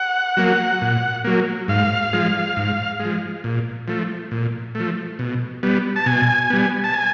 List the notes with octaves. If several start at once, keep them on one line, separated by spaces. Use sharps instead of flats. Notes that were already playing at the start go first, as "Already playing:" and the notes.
Already playing: F#5
F#3 A#3
A#2
F#3 A#3
G#2 F5
F3 G#3
G#2
G#3
F3
A#2
F3 A3
A#2
F3 A3
B2
G3 B3
A5
B2 G#5
G3 B3
A5
G#5